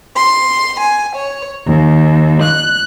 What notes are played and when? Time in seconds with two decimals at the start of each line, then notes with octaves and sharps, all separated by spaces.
0.17 C6
0.79 G#5
1.15 C#5
1.65 D#2
2.41 F#6